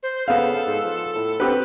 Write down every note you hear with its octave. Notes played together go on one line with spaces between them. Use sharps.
C5
C#3 B3 A4 F5
G#2
F3
A2
B3 C4 G4 B4